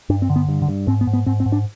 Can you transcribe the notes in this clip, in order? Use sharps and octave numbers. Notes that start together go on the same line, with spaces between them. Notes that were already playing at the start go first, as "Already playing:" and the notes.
G2 D4
C4
D3
B3
G2
D3
G2
G#2 C4
B3
G#2
B3
G#2 C4
C4
G#2
D4